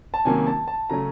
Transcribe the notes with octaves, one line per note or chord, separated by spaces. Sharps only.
A5
C3 D#3 F#3 A#3 C#4 G#5
A5
A5
C#3 F#3 A3 C#4 A#5